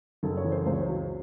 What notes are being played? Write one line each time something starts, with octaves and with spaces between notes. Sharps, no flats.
F#1 A4
C#5
E3
C5
C#2 C5
C#5
C5
F#3